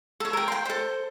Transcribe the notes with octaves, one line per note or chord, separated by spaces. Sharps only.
A4 C#5
A#4 G5
G5 C6
A4 C5